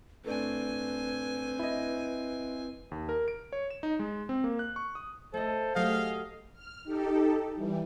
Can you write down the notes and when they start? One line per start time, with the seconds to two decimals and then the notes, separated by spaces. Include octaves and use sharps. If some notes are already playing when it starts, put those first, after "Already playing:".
0.24 A2 A3 C4 D4 B4 G#5
1.59 E4 D#5
2.91 D#2
3.09 A#4
3.28 D7
3.53 C#5
3.70 E7
3.83 D#4
3.99 G#3
4.29 C4
4.44 A#3
4.59 F#6
4.76 C#6
4.95 D#6
5.34 A3 A4 C5 D#5
5.76 F#3 A3 G4 G#4 D#5 F5
6.53 F6
6.84 D#4 G4 A4
7.54 E3 G3